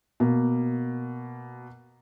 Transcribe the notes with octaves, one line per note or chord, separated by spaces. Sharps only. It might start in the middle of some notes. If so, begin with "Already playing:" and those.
B2 A#3